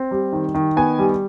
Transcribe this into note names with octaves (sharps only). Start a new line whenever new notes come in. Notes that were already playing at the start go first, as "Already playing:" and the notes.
Already playing: C4
G3
D#3
D#3
B3 G#5
G3